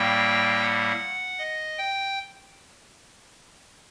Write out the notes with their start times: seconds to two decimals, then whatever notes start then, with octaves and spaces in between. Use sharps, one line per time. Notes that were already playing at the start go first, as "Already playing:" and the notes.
Already playing: A2 G3 A#3 G5
0.61 F#5
1.39 D#5
1.78 G5